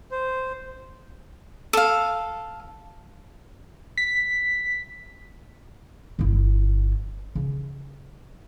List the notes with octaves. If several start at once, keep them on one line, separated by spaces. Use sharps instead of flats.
C5
A4 F5
B6
G1 E4
C#3